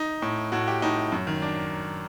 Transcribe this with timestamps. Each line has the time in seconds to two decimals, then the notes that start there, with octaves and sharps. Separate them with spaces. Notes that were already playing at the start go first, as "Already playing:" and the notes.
Already playing: D#4
0.22 A2
0.52 A2 F#4
0.68 G4
0.82 A2 D#4
1.12 F#2
1.27 D#3
1.42 D4